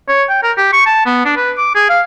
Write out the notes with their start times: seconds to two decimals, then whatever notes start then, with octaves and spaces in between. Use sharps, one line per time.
0.08 C#5
0.29 G5
0.43 A#4
0.57 G4
0.73 C#6
0.86 A5
1.06 B3
1.25 D4
1.36 B4
1.58 D6
1.75 G#4
1.89 F5